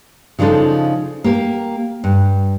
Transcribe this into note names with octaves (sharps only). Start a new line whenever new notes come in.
C#3 F3 D4 D#4 A4
A#3 G4 A#4
G2